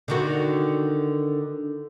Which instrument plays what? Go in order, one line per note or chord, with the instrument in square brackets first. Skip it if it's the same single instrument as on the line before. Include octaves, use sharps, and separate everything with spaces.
[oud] D3 D#3 F#4